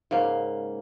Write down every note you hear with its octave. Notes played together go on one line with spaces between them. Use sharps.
G#2 C#3 A#3